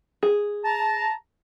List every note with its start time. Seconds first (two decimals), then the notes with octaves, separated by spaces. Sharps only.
0.23 G#4
0.65 A5 A#5